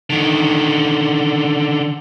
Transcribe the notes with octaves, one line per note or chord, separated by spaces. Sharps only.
D3 D#3